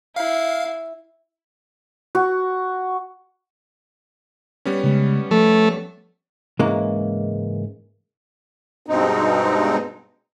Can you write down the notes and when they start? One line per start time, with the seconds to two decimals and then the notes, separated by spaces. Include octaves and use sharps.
0.16 E4 F5
2.15 F#4
4.65 G3 B3 C#4
4.84 C#3 G#3
5.31 F3 A3
6.59 G#2 C#3 E3 G#3 A#3
8.86 G2 B2 G#3 C4 D#4